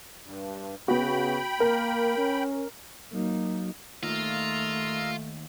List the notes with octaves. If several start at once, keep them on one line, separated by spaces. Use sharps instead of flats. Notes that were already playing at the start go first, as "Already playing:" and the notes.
G2
C#3 B3 F#4 G5 B5
A#3 A#4
C#4
F#3 A#3 D#4
D#2 A3 F4 A#4 D#5 E6